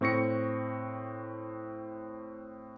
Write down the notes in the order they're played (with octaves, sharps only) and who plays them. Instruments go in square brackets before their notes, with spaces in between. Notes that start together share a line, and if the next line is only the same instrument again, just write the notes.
[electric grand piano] A2 C4 C#6 A#6 C#7